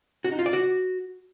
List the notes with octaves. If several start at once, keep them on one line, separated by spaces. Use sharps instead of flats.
F#4
D#4
F4
D5
F#4